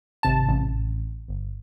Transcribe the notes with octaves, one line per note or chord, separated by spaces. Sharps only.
G#1 C3 A5
A1
G1